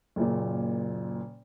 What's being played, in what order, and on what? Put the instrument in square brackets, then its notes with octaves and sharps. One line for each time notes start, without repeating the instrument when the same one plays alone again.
[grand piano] F#1 A#2